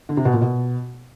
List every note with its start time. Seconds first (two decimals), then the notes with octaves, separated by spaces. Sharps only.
0.09 D3
0.17 C3
0.25 B2
0.33 A#2
0.41 B2